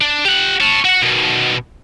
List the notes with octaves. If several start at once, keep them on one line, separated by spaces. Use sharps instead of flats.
D4
G4 F#5
C#5 A5
F#4 F#5
B2 D#3